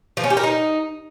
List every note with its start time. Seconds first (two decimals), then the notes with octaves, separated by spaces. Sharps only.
0.17 F3
0.24 C#4
0.30 G4
0.37 A#4
0.43 D#4